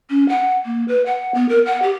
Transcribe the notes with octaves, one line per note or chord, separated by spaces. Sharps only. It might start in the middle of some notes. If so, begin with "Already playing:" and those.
C#4
F#5
A#3
B4
F#5
B3
A#4
F#5
G4